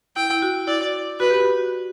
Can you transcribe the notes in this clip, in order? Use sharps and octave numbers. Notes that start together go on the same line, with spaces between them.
E4 G5
E4
F#4
E4 D5
F#4 B4
G4
F#4